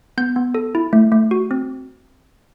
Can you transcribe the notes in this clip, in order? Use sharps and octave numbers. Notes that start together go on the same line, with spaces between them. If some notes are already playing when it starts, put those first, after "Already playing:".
B3 G6
B3
A4
E4
A3
A3
F#4
C4